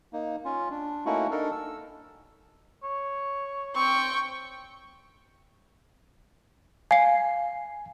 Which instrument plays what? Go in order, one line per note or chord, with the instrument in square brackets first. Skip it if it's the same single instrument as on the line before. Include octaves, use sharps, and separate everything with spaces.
[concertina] A#3 D#4
C#4 F4
D4
A3 A#3 C#4 D#4 E4 F#4
D4 D#4 A4 A#4
E6
[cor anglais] C#5
[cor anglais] C4 [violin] G5 C#6
[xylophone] F5 C7 [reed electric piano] G#5